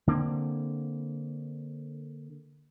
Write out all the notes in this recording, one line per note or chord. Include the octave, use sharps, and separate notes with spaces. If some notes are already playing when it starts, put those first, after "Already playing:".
D3 A#3 C4